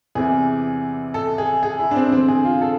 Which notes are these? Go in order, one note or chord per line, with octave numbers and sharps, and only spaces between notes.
E2 C3 E3 G#4
A4
G#4
G#4
E4
D4
C4
E2 D3 C4
G#4
F4
A4